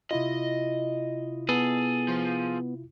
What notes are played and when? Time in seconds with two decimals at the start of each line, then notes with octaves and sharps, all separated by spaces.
0.11 C3 E4 F4 D#5
1.49 B3 G#4 A4
2.08 F3